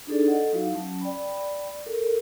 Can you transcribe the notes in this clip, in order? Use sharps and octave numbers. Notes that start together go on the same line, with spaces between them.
D4 D#4 G#4 A4 D5
A4 D#5 F#5
F#3 D#4 E4 F#4 F5
F#3 C#4 A5
D5 G5 B5
A4 A#4